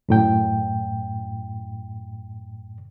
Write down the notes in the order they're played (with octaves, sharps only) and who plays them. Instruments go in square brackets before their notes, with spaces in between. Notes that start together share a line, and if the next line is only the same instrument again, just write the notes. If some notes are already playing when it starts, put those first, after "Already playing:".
[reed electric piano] F#2 A2 G5